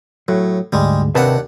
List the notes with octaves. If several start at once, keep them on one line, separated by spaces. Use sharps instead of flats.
A2 F#3
D2 G#2 G3 G#3
D#2 C3 D4 B4 F#5 A5